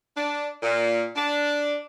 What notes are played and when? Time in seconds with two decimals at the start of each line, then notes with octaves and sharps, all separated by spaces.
0.17 D4
0.63 A#2
1.16 D4